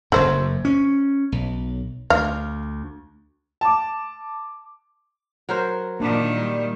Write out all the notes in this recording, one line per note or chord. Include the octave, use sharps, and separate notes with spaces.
F#1 F#2 A3 C5
C#4
B1
D2 F5
A5 D6
F#3 A#4 C5
A#2 D#3 A#3 D4
G3